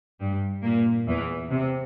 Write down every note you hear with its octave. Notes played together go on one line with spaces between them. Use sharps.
G2 G3
A#2 A#3
E2 E3
C3